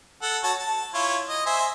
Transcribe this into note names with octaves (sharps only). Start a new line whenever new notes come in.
A4 F#5
F#4 C#5 A5
A5
E4 F4 C#5
D#5
C5 E5 G#5